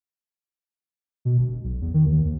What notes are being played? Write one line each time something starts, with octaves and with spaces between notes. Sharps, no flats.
B2
E1
B1
E2
D#3
D#2
D#2